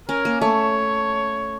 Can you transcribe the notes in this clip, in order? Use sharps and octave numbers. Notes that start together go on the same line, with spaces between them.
C#4 A#4
A#3
A3 C#5